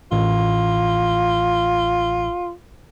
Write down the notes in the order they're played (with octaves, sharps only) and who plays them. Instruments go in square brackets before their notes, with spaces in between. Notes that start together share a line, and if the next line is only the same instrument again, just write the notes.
[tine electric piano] A1 [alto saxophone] F4